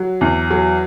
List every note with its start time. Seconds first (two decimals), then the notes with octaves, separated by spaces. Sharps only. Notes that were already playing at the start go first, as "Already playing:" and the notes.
Already playing: F#3
0.21 E2
0.50 F#3